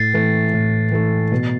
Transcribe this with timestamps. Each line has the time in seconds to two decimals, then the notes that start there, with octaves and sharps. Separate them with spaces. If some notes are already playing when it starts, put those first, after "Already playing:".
Already playing: A2 A6 C7
0.14 E3 A3
0.54 A2
0.92 E3 A3
1.32 B2